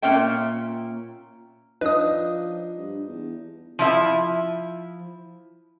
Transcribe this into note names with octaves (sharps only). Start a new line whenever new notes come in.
A#2 A#3 C#4 E5 G5
F3 D4 D#4 B4 D#5 D#6
G2
E2
F3 E4 E5